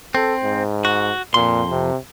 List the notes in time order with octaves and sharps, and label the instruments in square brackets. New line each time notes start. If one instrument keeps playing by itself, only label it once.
[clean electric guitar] C4 [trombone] A4
[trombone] G#2
[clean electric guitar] F#4
[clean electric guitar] F2 C6 [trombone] A#2
[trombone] C3